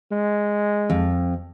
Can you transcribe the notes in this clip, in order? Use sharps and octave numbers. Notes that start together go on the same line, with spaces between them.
G#3
F2